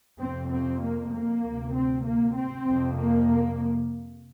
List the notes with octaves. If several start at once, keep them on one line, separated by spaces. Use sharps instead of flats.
F2 C3 C4
C4
A#3
A#3
D2 C3
C4
A#3
C4
F2 C3
A#3